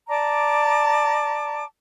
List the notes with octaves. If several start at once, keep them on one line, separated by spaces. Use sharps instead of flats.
D5 A5 A#5 D6